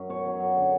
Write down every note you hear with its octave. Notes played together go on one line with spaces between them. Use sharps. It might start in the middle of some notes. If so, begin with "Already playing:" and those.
Already playing: F#2
B2 C#5
F#3
F#2
D3